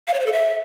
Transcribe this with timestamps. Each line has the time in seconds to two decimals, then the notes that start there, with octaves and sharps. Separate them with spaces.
0.07 F5
0.14 C#5
0.20 C5
0.26 A4
0.32 E5